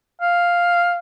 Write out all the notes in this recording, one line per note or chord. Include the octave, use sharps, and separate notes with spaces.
F5